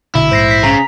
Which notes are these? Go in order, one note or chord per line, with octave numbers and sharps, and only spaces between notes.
A#1 B2 D3 E4
A#1 G#2 C5 A#6 C7
B6
C#3 A#5